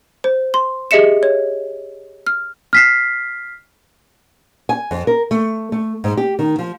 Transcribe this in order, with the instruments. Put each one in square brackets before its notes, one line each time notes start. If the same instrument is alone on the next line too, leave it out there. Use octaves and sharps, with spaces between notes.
[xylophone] C5
C6
G4 G#4 D#5 E5 C#7 E7
C#5
F6
[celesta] F6 B6 C7
[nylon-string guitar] G#5
F2
A#4
A3
A3
G#2
G4
D#3
F3